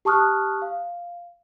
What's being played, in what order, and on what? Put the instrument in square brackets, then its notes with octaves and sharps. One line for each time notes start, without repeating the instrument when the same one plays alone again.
[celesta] G4 A5 C#6 D#6 F6 F#6
F5